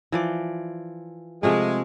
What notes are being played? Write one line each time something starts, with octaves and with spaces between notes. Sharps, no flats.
E3 F3 D5
C3 F3 G#3 A3